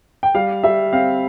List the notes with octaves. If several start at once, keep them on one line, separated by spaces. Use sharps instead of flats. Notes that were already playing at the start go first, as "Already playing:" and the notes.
G5
G3 F5
G3 E5
C4 F5